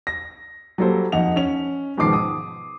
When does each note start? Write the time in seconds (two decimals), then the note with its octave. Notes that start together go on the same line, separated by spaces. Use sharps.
0.07 A#6
0.78 F#3 G3 A#3 A4 C5
1.12 F2 D#4 F#5 F7
1.36 C#4 F7
1.98 G#2 B2 D#3 F3 D6 C7
2.13 D#6